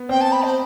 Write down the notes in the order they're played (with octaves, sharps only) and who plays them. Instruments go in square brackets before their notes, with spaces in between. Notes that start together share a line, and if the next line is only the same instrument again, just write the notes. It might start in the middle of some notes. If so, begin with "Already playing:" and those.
Already playing: [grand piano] B3
[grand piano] C4 [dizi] G5
[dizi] A5
B5
C5